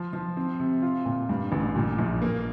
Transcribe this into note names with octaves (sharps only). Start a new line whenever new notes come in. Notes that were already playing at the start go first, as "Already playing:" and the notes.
Already playing: F3
F3
C4
C3
F4
A#2
G2
A1
A#2
A#1
A#3